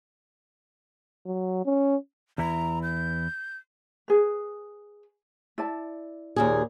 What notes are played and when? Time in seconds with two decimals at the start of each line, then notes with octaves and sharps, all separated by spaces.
1.26 F#3
1.65 C#4
2.38 E2 E3 E4 A#5
2.83 G6
4.08 G#4 B4
5.58 E4 D5 A5
6.36 D#2 A#2 G#4